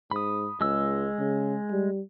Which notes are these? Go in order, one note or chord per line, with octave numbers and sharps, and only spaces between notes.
G#2 B5 D#6
C#2 G#3 E6
C#3
G3